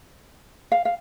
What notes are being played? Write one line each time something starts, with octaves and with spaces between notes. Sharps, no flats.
F5
F5